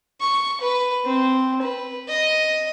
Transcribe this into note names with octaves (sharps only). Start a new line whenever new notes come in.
C#6
B4
C4
B4
D#5